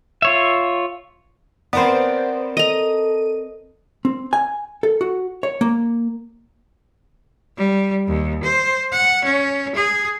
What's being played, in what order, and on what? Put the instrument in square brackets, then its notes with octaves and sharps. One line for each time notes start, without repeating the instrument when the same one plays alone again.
[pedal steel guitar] F4 C#5 E5
[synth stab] B3 C5 [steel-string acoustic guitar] C4 A#4 D5
[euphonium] A4 [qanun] D#5 A#5 [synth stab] D#7
[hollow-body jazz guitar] C4
G#5
A4
F#4
C#5
A#3
[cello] G3
D#2
C5
F#5
C#4
G#4